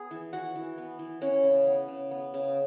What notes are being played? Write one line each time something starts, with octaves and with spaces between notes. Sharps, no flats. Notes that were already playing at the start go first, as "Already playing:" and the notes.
Already playing: B3 G#4 G#5
E3
E3 F#4 F#5
E3
B3
E3
E3 C#4 C#5
C#3
B3
C#3
B3
C#3